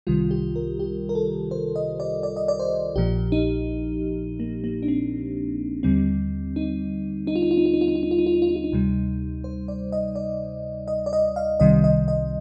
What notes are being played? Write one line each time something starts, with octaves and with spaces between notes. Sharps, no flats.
C2 C3 D#3 G3 F4
G4
A#4
G4
A#4
A4
C5
D#5
D5
D5
D#5
D5
C5
A#1 A#2 F3 G4
D#4
A#3
A#3
D4
C4
D#2 D3 G3 C4
D#4
D#4
F4
D#4
F4
D#4
F4
D#4
F4
D#4
F4
D#4
F4
D#4
F4
D#4
F4
D#4
F4
D#4
D2 C3 G3
C5
D5
D#5
D5
D#5
D5
D#5
F5
C2 C3 D#3 G3 D#5
D#5
D#5